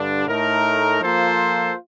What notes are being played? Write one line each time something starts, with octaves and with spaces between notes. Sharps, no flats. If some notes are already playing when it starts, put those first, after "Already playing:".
Already playing: G2 D3 G3 D4
A2 A3 D#4 A#4
F3 A#3 F4 A4 C5